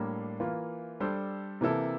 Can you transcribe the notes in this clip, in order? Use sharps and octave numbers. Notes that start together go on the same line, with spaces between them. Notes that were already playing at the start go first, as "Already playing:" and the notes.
Already playing: A2 G3 A#3 D4
E3 A#3 F4
G3 D4 A4 C5
C3 E3 A#3 E4 A4